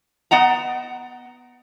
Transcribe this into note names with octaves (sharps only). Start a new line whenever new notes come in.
B3 D#5 F#5 A#5